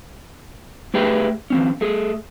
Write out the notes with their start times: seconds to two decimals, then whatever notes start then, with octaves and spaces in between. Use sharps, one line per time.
0.94 A3 G4 G#4 B4 E5 G5
1.50 E3 C4 C#4
1.81 A3 G#4